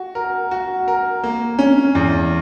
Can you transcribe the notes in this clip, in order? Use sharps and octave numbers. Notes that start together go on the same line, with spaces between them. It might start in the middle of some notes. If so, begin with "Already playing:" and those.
Already playing: F#4
A#4
F#4
A#4
A#3
C#4
E2